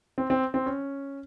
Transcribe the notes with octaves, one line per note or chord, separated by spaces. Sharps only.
C4
C4
C4
C#4